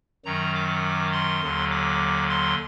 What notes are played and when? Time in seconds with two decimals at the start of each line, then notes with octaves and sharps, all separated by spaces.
0.25 F#2 D#3 F#3 A#5
0.54 D6
1.12 C6
1.42 D#2 D3 F#3
1.71 D6
2.29 C6